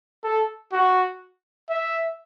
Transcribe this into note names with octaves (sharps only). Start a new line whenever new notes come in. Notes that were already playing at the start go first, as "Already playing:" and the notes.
A4
F#4
E5